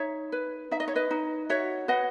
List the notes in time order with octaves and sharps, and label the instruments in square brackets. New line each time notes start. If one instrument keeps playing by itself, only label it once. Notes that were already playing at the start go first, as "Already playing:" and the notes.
Already playing: [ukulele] D#4 C#5 E5
B4
D#4 E5
D#5
C#5
B4 D#5
D#4
F#4 C#5 E5
B4 D#5 F#5